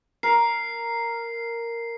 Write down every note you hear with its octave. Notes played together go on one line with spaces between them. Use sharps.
A#4 C7